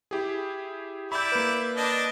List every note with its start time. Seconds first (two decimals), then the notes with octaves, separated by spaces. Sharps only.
0.11 E4 G4 G#4
1.12 E4 D5 B5 G6
1.32 A#3 B4
1.77 D4 D#5